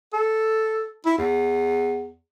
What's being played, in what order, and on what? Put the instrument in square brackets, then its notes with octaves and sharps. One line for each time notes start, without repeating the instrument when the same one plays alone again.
[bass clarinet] A4
E4
E2